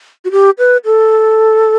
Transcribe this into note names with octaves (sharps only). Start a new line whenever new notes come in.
F#4
G4
B4
A4